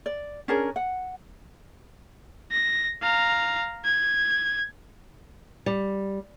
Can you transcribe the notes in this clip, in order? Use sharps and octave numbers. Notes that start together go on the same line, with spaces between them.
D5
C#4 D4 G#4 A#4
F#5
A#6
F5 A#5
G#6
G3